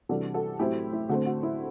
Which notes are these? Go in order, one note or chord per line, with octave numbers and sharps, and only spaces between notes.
C3 E3 G3 D4 F#4 A4
F#4 A4
A2 F#3 C4 E4 G4
E4
D3 A3 C4 F#4
F#4
E4